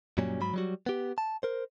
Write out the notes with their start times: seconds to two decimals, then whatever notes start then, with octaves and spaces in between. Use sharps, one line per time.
0.18 F#2 A#2 F#3 G3 C#4
0.40 G#2 F#3 B5
0.54 F#3 G3 F#4
0.86 B3 G4
1.18 A5
1.43 A#4 C5